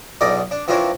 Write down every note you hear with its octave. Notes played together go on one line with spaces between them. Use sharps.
B1 E2 D#4 D5 D#5
D4
E3 F3 C4 D4 A#4 C#5